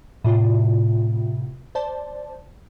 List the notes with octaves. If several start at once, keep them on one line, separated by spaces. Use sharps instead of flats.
A2 C3 F4
C5 D5 A5